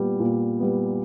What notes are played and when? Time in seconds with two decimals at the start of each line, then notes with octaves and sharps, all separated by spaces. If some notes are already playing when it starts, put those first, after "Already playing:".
Already playing: A#2 G3 B3
0.20 A#2
0.59 G3 B3